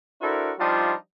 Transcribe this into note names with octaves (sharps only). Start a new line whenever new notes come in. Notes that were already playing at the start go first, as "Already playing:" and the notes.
D4 E4 F#4 A4 A#4 C5
F3 G3 D4 D#4 F4